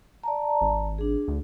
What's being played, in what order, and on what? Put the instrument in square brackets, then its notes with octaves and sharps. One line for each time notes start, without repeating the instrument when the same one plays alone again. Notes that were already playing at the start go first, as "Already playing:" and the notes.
[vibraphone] D5 A5 A#5
[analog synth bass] G#1
[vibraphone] D4 G#4
[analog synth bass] D2